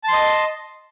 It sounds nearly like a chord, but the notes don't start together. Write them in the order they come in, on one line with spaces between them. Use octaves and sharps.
A5 C6 D#5